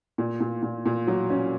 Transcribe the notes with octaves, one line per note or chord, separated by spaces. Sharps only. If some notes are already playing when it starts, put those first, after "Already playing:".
A#2
A#2
A#2
A#2
F#3
C#4